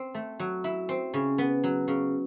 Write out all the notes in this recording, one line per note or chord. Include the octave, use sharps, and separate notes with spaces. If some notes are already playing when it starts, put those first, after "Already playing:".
Already playing: C4
A3
F#3
E4
C4
C#3
B3
F#3
C#3